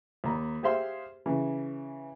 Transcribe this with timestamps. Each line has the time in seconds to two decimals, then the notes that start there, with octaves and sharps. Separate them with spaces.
0.24 D#2 A#5 B5
0.63 G4 G#4 C5 E5 F5 C6
1.26 C#3 E3